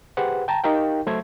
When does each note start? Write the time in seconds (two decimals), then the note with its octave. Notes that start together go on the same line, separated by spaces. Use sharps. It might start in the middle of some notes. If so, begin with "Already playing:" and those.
0.17 G4 G#4 B4 C5 F#5
0.48 G5 A5 A#5
0.64 D#4 G4 A#4 F5 G5
1.06 F#3 A3 C5 E5 G#6